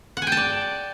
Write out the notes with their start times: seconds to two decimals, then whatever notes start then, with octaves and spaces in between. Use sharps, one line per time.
0.17 F#5
0.22 G#5
0.27 G5
0.32 A5
0.37 D5